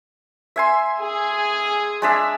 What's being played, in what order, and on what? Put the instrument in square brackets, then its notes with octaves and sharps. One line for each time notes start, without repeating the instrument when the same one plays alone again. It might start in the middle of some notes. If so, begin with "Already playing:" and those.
[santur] E5 G#5 C6
[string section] G#4
[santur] G#3 D4 E5